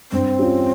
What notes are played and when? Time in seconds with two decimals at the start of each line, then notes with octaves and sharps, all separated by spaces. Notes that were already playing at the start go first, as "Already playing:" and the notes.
0.12 G2 C4
0.39 G3 C#4 F4